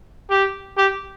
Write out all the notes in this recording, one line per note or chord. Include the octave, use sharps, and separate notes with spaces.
G4
G4